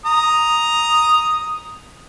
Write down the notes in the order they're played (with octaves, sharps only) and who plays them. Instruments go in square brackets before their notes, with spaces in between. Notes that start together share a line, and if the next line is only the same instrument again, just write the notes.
[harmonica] A#5 D#6